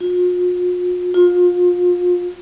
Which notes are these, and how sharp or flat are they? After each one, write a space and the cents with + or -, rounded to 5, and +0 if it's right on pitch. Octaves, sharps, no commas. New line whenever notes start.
F4 +45
F4 +30